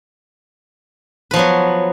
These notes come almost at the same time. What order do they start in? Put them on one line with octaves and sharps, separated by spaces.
B4 F3 B3 F#3